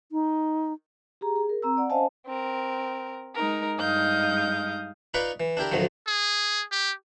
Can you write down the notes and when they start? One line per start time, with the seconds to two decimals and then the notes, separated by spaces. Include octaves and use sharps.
0.12 D#4
1.21 G4 G#4 A#5
1.36 G#4
1.49 A#4
1.62 C4 A#5 E6
1.77 D5 F#5
1.90 C#4 C5 D#5 F5 G#5 A5
2.27 C4 A#4
3.35 G#3 D#4 A#4
3.79 G2 G#3 D#4 F5 D#6 G6
5.14 D#4 F4 B4 D5 B5 C#6
5.40 E3
5.57 D4 E4 G4 A#4
5.72 D2 A2 D#3 F3 F#3
6.07 G#4
6.72 G4